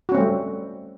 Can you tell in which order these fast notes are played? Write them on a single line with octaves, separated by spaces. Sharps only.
F#4 C#4 C4 A3 G3